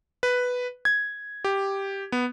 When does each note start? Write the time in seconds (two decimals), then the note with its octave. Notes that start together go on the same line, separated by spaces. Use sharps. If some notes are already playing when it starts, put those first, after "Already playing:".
0.23 B4
0.85 G#6
1.44 G4
2.12 B3